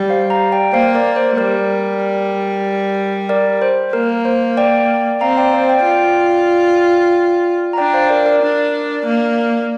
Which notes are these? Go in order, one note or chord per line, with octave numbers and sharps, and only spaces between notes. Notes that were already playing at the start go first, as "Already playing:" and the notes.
Already playing: G3
C5 F5
F5 A#5
D5 G5
A#3 C5 F5
A#4 D5
C5
G3 A#4 D5
A#4 D5
C5
A#3 A#4
C5
D5 G5
C4 F5 A#5
D5 G5
C5 F5
D5 G5
F4 D5 G5
A#5
D4 D5 G5
C5 F5
A#4 D5
A#4 D5
D4
A#3